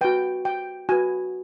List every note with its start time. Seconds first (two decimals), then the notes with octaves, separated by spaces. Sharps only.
0.01 F#4 B4 G5
0.45 G5
0.89 F#4 B4 G#5